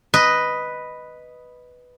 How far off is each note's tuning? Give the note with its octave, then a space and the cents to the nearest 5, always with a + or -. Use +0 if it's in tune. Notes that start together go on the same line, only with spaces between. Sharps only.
B4 +0 D#5 +0